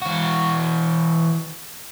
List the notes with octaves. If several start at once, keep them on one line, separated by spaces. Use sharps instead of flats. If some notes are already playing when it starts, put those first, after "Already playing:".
E3 F#4